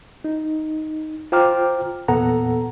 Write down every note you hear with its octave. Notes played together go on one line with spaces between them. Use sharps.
D#4
F4 C5 G5 A#5 D6 F6
E2 A#2 B3 A4 F#5 A#5